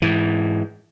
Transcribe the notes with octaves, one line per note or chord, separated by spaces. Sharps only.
G#2 E3